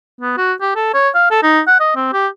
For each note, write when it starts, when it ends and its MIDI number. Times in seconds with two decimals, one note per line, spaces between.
0.21 0.37 59
0.37 0.53 66
0.61 0.74 67
0.76 0.92 69
0.94 1.09 73
1.15 1.28 77
1.31 1.41 69
1.43 1.61 63
1.67 1.78 78
1.80 1.92 75
1.96 2.09 60
2.13 2.28 67